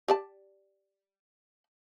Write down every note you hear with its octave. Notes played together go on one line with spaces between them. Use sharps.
G4 D5 A5